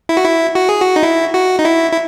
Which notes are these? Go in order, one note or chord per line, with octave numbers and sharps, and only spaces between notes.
E4
F#4
E4
F#4
G#4
F#4
D#4
E4
F#4
D#4
E4
E4